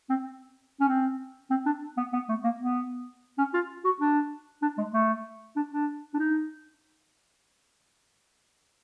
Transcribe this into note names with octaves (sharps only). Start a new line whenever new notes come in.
C4
C#4
C4
C4
D4
B3
B3
A3
A#3
B3
C#4
F4
F#4
D4
D4
G#3
A3
D4
D4
D4
D#4